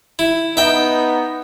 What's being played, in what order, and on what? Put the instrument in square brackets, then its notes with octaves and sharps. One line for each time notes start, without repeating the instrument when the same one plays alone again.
[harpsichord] E4
[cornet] B3 [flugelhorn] D#4 [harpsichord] E5 G5